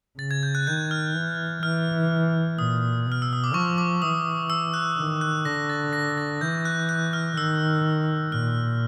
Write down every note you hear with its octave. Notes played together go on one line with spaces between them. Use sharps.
C#3 A6
G#6
G6
F#6
D#3 G6
F6
E3
E3 F6
A#2 D#6
B2
F6
E6
D#6
D6
F3 C#6
D6
E3 D#6
E6
F#6
D#3
F#6
D3 A#6
A6
A#6
A6
E3 G6
F#6
F#6
F6
D#3 E6
A#2 F6